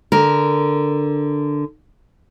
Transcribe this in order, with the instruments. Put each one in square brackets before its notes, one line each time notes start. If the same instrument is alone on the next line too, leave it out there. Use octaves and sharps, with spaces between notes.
[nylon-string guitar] D3 A#4